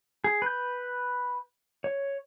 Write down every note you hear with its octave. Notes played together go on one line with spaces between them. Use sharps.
G#4
B4 G6
C#5